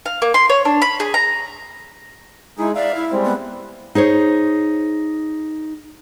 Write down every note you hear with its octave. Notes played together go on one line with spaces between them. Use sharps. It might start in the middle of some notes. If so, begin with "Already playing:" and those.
F5
A#3
C6
C#5
D4
B5
G#4
A#5
G#3 D#4 E4 G#4
D5 E5 F5
E4
G3 G#3 C4
B3
D#4 G#4 C5 C#5